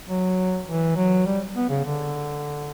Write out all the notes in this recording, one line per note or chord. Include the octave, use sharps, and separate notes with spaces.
F#3
E3
F#3
G3
B3
C#3
D3